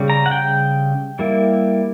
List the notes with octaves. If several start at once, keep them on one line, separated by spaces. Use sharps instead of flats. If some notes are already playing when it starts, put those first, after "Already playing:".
Already playing: C#3 G3
A#5
F#5
G5
G3 A#3 E4